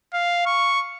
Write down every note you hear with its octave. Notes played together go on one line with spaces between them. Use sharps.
F5
C#6